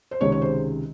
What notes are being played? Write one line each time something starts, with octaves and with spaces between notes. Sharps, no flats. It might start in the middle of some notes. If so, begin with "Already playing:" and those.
C5
C#2 C3 D#3 G#3 C#5
C#5
C5